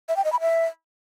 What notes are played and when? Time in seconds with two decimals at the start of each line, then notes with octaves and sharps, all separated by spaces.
0.09 E5
0.17 G5
0.25 D#5
0.33 B5
0.41 E5